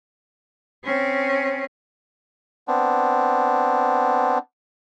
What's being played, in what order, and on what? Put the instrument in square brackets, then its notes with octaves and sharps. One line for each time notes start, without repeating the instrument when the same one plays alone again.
[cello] C4 C#4
[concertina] B3 C4 D4